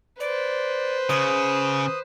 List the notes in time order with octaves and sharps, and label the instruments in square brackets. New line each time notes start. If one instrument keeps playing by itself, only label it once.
[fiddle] B4 C5 [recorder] D5
[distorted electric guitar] C#3 [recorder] D#6